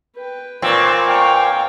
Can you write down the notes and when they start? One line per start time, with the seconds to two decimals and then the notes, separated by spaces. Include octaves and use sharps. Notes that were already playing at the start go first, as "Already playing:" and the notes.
0.15 B4 G5
0.62 A#2 C4 B4 C#6
1.07 F5 G5 C#6